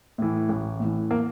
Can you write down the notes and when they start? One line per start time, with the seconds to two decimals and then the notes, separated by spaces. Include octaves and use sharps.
0.18 A2 E3
0.49 A1
0.80 A2 E3
1.11 A#3